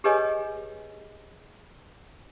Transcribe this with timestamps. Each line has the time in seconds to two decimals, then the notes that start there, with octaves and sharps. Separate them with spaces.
0.04 G4 G#4 B4 C#5 D#5 G#5